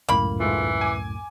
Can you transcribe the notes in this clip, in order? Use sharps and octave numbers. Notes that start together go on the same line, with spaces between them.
C#2 F#2 A2 A#3 B5
G#2 E3 A3 F4
G#5 D6